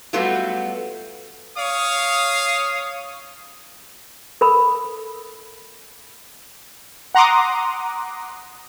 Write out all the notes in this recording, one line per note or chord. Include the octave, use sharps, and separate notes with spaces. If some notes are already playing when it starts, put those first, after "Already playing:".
F#3 G3 A3 B3 F4 F#4
C#5 F5 D#6
A4 A#4 B5
F#5 A#5 C6 D6 D#6